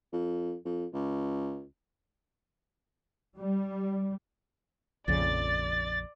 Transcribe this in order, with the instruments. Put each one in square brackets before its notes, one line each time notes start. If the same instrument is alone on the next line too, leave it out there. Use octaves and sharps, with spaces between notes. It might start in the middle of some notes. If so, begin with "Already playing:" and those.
[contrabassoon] F2
F2
C#2
[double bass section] G3
[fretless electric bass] A#1 F2 C#3 [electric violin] D5 [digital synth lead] A6